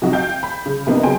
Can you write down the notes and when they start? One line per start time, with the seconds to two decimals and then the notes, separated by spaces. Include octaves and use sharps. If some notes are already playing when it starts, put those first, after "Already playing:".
0.02 C3 F3 D#4 F#4
0.13 F5 G5 G6
0.43 B5
0.66 C#3
0.86 F2 C3 A#3 B3 D4 D#4
1.03 C#3 F#3 G5 G#5 C6